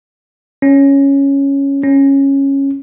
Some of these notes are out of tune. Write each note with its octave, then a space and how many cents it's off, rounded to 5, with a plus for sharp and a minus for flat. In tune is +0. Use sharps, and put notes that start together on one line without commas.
C#4 +0
C#4 -10